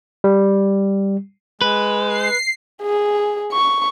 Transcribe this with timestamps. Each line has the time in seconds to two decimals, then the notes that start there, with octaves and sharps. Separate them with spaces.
0.24 G3
1.62 G#3 B4
2.08 C7
2.83 G#4
3.52 C#6